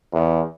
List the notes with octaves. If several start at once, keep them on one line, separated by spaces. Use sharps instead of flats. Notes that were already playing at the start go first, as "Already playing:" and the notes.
E2